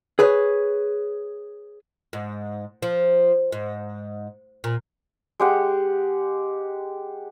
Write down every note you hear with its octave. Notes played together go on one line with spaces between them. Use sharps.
G#4 B4 C#5
G#2
F3
G#2
A#2
G#3 G4 F#5